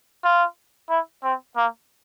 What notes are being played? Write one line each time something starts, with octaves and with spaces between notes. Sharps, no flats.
F4
E4
C4
A#3